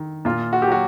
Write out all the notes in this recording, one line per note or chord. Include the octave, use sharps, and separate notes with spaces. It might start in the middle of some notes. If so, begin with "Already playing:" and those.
Already playing: D#3
A#2 F4
F#4
G4
F#3 F#4